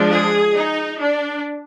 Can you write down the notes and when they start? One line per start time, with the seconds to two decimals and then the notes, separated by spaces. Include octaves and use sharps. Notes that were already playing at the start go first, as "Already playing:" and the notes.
Already playing: F3 G#3 D4
0.09 G#4
0.53 D#4
0.99 D4